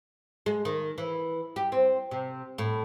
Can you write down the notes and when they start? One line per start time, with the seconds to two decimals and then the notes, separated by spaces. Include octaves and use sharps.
0.46 G#3
0.65 D#3
0.98 E3
1.56 G4
1.72 C4
2.11 C3
2.58 A2